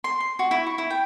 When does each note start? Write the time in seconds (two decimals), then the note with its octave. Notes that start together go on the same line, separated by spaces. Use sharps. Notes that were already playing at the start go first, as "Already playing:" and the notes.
0.04 C6
0.20 C6
0.39 F#4
0.51 E4
0.67 C#6
0.78 E4
0.90 G5